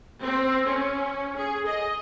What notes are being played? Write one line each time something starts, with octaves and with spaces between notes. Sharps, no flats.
C4
C#4
G#4
D#5